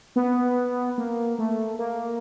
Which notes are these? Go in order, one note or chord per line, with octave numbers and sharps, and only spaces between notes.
B3
A#3
A3
A#3